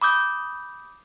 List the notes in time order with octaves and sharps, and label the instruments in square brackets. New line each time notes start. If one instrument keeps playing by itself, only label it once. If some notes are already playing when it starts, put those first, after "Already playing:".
[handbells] B5 D6 D#6 G6